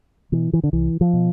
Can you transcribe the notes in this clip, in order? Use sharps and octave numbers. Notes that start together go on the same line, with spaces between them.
B2 E3
E3
D3
C2 E3
F3
B2